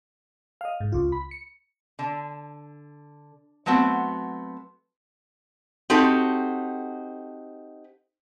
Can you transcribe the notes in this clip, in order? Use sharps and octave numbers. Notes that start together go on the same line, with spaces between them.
D#5 F5
G#2
C#2 F4
B5
C#7
D3
F#3 A3 B3 C4 F#4
C4 D#4 F#4 G4 A4